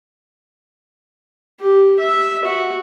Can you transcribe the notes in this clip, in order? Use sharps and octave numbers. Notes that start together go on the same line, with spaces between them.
G4
E5
F#4